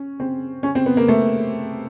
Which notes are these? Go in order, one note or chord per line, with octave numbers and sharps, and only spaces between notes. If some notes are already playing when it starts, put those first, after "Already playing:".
Already playing: C#4
C4
C#4
C4
B3
A#3
A3